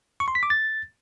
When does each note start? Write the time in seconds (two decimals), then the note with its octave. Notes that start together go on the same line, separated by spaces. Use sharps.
0.20 C#6
0.28 C6
0.35 B6
0.43 D6
0.50 A6